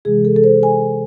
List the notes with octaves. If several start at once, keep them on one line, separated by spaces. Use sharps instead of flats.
C3 E3 G#3 G#4
A4
A4
C5
G#5